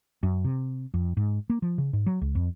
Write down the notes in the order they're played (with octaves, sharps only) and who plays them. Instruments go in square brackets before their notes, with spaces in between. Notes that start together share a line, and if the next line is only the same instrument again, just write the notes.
[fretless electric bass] F#2
C3
F2
G#2
A#3
F3
C#3
G#2
F#3
C#2
F2